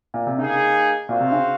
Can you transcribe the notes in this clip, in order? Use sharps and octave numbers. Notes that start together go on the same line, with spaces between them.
A#2
C3
C#3 A#3 D#4 G#4
A#2 C4 F#4 C5 F5
C3
C#3